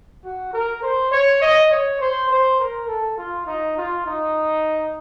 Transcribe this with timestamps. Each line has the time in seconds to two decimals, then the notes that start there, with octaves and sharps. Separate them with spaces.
0.24 F#4
0.53 A#4
0.82 C5
1.12 C#5
1.42 D#5
1.71 C#5
2.00 C5
2.30 C5
2.59 A#4
2.88 A4
3.18 F4
3.47 D#4
3.77 F4
4.06 D#4